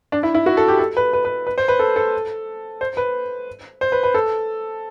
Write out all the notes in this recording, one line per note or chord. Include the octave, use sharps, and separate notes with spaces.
D4
E4
E4
F#4
A4
G4
A4
B4
B4
B4
B4
C5
B4
A4
A4
C5
B4
C5
B4
B4
A4